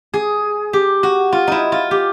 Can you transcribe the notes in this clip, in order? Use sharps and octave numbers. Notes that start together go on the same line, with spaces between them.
G#4
G4
F#4
F4
D#4 E4
F4
G4